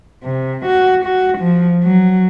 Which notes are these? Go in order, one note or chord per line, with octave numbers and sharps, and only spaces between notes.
C3
F#4
F#4
F3
F#3